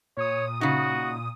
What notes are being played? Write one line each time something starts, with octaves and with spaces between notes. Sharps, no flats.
A#2 C#5 D#6
C#3 D#4 F#4